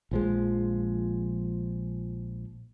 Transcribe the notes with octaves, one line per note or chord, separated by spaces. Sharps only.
A#1 F3 G#3